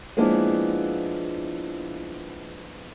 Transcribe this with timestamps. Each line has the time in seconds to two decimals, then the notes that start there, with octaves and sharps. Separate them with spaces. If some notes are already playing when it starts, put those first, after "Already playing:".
0.17 F3 G#3 A#3 B3 D4 E4